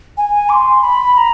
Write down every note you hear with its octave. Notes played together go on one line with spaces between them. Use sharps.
G#5
D6
C6
B5
B5
A#5